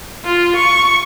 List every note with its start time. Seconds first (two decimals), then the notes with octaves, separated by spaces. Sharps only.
0.25 F4
0.56 C#6